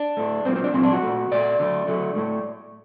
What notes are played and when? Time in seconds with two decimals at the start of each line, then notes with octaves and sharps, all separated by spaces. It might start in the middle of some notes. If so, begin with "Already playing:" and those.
Already playing: D4
0.17 A2 A3
0.45 A#2 F#3 A#3 C4
0.56 C4
0.64 D4
0.73 A#2 F#3 A#3 C4
0.83 D4
0.93 F#4
1.02 A#2 A3
1.32 A#2 A3 D5
1.59 D3 F#3 A3
1.87 D3 F#3 A3
2.16 A2 A3